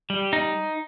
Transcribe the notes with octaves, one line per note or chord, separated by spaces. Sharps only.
G3
D#4